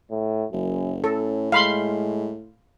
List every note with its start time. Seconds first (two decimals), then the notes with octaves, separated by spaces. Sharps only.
0.11 A2
0.52 F#1 F#2
1.04 A2 C#4 A4
1.52 G#3 F5 B5 C6